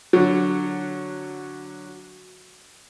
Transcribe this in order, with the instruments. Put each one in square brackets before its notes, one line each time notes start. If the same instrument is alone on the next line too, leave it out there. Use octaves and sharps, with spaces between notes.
[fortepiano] D3 F#3